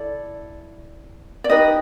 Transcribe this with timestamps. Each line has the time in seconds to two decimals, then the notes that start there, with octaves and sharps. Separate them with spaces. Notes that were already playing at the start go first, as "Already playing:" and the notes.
Already playing: E4 A4 D5
1.44 D5
1.50 D#4 G4 B4 D#5